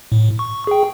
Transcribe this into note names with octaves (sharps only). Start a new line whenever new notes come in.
A2
C#6
G#4 G5